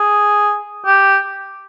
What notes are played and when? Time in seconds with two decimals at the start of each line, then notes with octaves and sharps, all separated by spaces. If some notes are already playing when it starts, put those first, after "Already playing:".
Already playing: G#4
0.86 G4